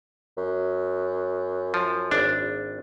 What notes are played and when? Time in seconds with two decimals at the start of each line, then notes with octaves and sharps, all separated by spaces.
0.37 F#2
1.74 F3
2.11 G#1 D4